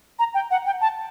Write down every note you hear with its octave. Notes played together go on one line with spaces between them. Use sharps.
A#5
G5
F#5
G5
A5